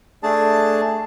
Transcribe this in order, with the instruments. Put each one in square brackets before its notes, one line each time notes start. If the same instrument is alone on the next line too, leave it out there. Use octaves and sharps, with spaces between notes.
[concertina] A3 D4 G#4 A5